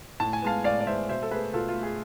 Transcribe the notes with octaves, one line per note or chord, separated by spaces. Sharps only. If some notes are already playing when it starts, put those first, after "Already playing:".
A2 A5
G#5
G#3 B3 F5 A5
A2 D5 F5
D5
G#3 B3 C5 E5
B2 C5 E5
A4
A3 G#4 B4
B2 F4 A4
F4
A3
G#4